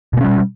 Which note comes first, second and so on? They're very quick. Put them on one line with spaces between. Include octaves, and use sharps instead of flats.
B2 A#3 C#4 G3